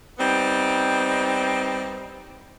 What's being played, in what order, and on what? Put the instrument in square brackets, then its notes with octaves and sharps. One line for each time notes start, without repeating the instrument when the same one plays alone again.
[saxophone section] G3 B3 C4 D#4